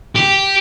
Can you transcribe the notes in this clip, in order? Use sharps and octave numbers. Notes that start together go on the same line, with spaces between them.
G4